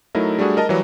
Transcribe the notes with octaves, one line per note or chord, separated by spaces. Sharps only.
F#3 A3 D#4 E4 A#4
G3 A3 D4 F#4 G#4
A#4 D#5 A5
E3 F#3 G3